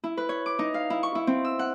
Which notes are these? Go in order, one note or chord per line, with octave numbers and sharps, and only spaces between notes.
E4
B4
C#5
D6
D#4
F5
E4
C#6
E4
C4
E6
F#5